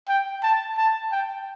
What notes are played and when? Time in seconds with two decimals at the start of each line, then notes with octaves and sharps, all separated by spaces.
0.08 G5
0.43 A5
0.77 A5
1.12 G5